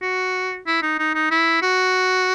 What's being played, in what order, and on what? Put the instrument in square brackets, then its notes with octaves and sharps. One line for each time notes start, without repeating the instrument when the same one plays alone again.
[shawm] F#4
E4
D#4
D#4
D#4
E4
F#4